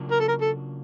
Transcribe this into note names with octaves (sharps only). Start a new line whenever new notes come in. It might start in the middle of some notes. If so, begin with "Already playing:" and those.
Already playing: C#3 F#3 A#3 D4 F4
A#4
A4
A#4
A4